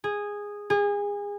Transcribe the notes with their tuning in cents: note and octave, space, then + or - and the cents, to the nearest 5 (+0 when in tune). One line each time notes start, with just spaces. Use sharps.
G#4 -10
G#4 -30